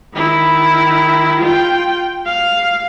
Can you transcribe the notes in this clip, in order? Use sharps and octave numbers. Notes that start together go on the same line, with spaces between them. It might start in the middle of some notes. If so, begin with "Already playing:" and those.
D#3 E4
F4 G5
F5